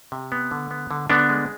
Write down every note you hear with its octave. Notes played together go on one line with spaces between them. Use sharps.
C3
B3
D3
B3
D3
D3 B3 D4
G#3